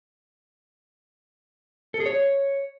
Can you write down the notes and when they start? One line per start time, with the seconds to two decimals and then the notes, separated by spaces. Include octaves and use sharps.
1.94 A4
2.00 G#4
2.06 C#5